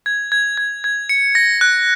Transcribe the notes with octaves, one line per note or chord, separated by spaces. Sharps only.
G#6
G#6
G#6
G#6
C#7
A#6
F#6